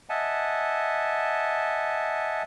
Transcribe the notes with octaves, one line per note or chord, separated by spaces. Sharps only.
D#5 E5 F#5 G#5 A5